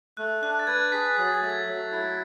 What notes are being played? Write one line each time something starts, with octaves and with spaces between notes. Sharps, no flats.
A3 F#6
D4 F#6
A6
B4 G#6
G#4 B6
F#3 A6
A6
A3 G#6
A6
F#3
E4